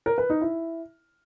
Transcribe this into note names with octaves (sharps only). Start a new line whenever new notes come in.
A#4
B4
D#4
E4